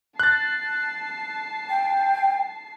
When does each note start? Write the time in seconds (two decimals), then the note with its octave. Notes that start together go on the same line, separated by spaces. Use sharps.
0.20 A5 F#6 A6 C7
1.70 G5